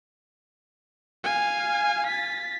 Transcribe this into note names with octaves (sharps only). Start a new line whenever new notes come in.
F5 G#5
A6 B6